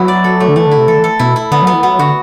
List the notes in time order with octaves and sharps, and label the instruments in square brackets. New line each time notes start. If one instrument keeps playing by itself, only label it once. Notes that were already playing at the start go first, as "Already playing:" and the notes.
Already playing: [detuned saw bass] F#3 [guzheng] B3 E4
[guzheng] D5
A4
A3
[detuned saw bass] D3
[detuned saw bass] E3 [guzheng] A3
[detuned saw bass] D3
[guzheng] E4
[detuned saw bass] C3
[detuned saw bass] E3 [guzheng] A4
[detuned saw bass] D3
E3
[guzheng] A4
[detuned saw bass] B2 [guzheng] E4
[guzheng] E4
[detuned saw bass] D3 [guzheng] B3
[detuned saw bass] F#3
[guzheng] B3
[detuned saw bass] E3
[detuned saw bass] F#3 [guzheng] B3
[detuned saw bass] D3 [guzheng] F#4